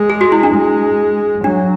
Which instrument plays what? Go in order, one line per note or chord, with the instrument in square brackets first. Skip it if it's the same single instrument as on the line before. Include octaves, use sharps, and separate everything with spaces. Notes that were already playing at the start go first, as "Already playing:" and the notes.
Already playing: [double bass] G#3
[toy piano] G#4
F#4
E4
D4
[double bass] G#3
[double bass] F#3 [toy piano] D4